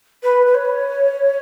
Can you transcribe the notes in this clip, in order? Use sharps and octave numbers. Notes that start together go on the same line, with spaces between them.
B4
B4
C#5